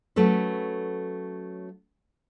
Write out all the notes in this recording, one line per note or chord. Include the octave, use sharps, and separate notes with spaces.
F#3 A3 C#4 A4 B4